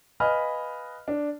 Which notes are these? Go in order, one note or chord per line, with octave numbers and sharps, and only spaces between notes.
B4 D#5 F5 G#5 B5 F6
D4